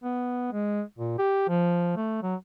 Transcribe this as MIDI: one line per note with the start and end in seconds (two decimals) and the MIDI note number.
0.04 0.48 59
0.52 0.81 56
0.98 1.18 46
1.18 1.47 67
1.48 1.93 53
1.96 2.21 57
2.23 2.35 54